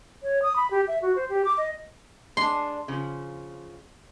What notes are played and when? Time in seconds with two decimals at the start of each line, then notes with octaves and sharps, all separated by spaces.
0.23 C#5
0.42 D#6
0.56 B5
0.71 G4
0.88 E5
1.02 F#4
1.16 C5
1.30 G4
1.45 D6
1.58 D#5
2.37 G#3 D4 C6
2.88 C#3 F3